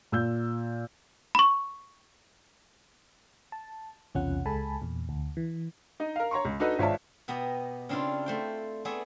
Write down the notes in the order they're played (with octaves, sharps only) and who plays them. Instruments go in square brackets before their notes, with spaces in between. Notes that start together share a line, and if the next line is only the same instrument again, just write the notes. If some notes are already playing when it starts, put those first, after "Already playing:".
[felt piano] A#2 E6 G6
[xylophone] B5 C#6
[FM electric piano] A5
B1 E2 C3 C#4 F4 F#5
C#2 G#3 A4 G#5 A5 B5
E2 A#2
D2
E3
[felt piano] D#4 D#5
A#4 F5
C#5 A#5 C6 C#6
C#2
D4 D#4 F#4 A4 B4 D#5
G#1 F4 C#5 D5 E5 A5
[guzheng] B2 B3 G4 D#5 A#5
C#3 C4 D4 E4 F4
A3 C5 G5
A3 B3 G#4 D5 E5